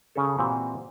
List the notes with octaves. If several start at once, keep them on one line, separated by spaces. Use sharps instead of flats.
C#3 C#4 G#4 A4
A#2 E3 C4 F#4 G4